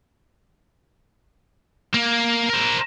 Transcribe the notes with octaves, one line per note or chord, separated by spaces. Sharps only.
A#3
A#4 C5